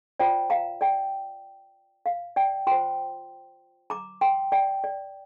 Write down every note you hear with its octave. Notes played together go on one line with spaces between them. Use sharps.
F4 C5 D5 G5
F5 A#5
D5 G5
F5
D5 G5
F4 C5 G5 C6
A#5 D6
G5 C6
D5 G5
D5